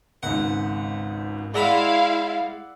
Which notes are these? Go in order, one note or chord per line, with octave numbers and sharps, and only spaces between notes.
G#1 C#2 G#2 F#5
G#3 E4 D5 F5 F#5 A#5 B5 E6